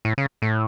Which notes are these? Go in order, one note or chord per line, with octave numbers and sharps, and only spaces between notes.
A2
C#3
A2